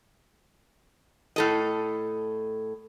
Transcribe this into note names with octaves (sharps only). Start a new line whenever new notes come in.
A2 A4 D#5